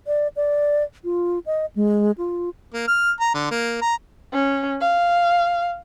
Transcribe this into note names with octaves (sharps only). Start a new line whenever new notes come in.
D5
D5
F4
D#5
G#3
F4
A#3
F6
A#5
D3
A#3
A#5
C#4
F5